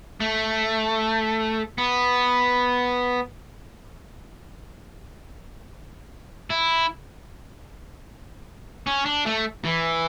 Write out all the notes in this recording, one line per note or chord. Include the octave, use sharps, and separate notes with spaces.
A3
B3
E4
C#4
D4
A3
E3